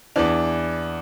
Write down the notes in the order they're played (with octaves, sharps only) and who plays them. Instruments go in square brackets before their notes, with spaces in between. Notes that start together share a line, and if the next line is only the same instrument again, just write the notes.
[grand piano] E2 E3 D4